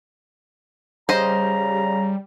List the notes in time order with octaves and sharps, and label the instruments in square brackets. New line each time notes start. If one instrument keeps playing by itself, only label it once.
[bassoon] C#3 [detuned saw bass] G3 [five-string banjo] C5 D#5 [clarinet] A#5